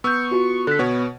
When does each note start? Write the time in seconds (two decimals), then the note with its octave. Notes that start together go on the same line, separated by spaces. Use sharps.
0.04 B3 C#6 E6 G6
0.31 F4 F#4
0.67 D3 A4 F#6 B6
0.79 B2 B3 F#4 B4 C#5